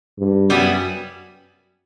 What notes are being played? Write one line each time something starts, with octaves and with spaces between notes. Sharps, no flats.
G2
F#2 G3 B3 E4 G#4